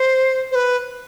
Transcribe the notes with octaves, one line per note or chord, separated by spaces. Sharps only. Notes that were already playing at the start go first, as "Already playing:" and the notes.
Already playing: C5
C5
B4